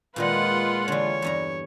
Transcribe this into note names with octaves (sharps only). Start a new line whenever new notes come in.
A#2 D#3 G#3 D#4 F4 B4 F#5
D3 E3 C#5
E2 G2 A#5